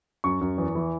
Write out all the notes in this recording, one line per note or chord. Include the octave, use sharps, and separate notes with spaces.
F#2 C#6
F#2
E2
E3